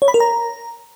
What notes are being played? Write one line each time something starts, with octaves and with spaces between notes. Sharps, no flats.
C#5
B5
A#4
A#5